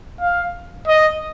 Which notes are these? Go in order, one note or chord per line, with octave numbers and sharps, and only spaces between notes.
F5
D#5